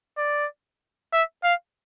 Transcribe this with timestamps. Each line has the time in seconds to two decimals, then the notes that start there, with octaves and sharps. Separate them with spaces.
0.18 D5
1.13 E5
1.44 F5